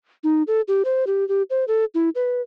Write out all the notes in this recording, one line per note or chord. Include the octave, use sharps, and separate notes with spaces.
D#4
A4
G4
C5
G4
G4
C5
A4
E4
B4